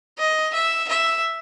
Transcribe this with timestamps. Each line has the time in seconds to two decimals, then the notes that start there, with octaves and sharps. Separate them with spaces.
0.18 D#5
0.54 E5
0.89 E5